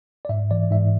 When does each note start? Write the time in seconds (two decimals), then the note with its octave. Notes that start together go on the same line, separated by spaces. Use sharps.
0.25 D5
0.29 G#2 E5
0.51 E3 D5
0.71 G#2 E5